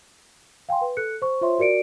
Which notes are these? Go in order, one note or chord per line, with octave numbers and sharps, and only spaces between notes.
F5 G5 G#5 C6
B4
A4 F#6 C#7
C5 C#6
F4 C5 C#5 E5 C6
F#4 A#4 D5 C#7 D7